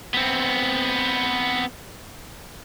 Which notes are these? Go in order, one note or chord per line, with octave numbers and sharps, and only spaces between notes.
B3 C4